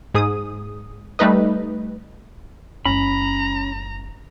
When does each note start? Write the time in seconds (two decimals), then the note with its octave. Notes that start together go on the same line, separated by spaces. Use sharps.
0.14 G#2 G#4 D#6
1.19 G3 A3 D#4 B4 D#5
2.85 F#1 G#3 C#4 A#5 B5